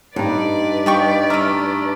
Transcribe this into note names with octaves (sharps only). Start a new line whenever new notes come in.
G2 D#4 B4 D5
F3 G3 D#5 G5 C#6
A3 C#4 A#5 C#6 F6